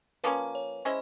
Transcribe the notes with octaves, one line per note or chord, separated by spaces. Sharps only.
F3 A#3 C#4 B4
C#5
G#3 C#4 E4 C5